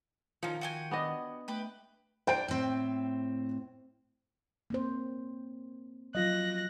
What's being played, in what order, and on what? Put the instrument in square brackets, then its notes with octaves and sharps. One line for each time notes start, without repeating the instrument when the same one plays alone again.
[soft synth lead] D#3 [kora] F3 [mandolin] C#4 D#4
[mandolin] F#4 G5 G#5
[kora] B3 D4 D#5
[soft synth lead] A3 [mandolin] G4 B4 B5
[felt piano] C5 G5 D7 [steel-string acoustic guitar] D5
[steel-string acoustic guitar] A2 C4
[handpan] A#3 C4 C5
[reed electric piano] F3 F4 D#5 [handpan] F#3 [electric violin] F#6 A#6